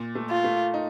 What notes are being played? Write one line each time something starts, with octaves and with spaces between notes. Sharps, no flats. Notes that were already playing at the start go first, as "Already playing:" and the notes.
Already playing: A#2
A3
F4
A3
D#4